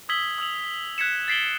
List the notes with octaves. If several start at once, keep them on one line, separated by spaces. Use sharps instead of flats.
D#6 E6 G#6 B6 F#7 G7
D#6 E6 F7 F#7
F#6 G#6 B6 C#7 E7
A6 B6 C7 D7 F#7 G7